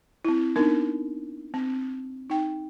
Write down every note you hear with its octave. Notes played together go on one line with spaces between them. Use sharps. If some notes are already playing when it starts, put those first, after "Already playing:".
C4 E4
B3 D4 D#4 A#4
C4
D#4 G5